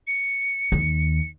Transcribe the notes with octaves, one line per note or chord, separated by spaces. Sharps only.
C#7
D#2